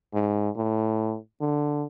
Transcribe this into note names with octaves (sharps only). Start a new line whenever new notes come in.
G#2
A2
D3